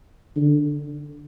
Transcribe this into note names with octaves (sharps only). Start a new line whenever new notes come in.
D3